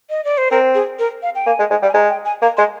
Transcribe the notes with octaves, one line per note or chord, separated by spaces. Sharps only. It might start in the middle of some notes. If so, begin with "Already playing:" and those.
D#5
D5
C5
C4 A#4
G#4
A#4
F5
G5
A#3 G#5
G#3
G#3
G3
G#5
G#3 A#5
G5
G#5
A#3 A#5
G#3 C6